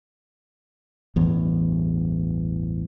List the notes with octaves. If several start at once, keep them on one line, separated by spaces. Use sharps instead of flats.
A1 E2 G2